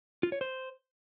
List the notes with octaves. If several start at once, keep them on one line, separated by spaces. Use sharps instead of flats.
F4
C#5
C5